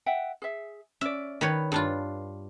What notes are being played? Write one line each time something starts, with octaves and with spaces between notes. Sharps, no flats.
E5 F#5 G5
G#4 E5
C#4 D5 E5
D#3 B4 C#5
G2 D4 F4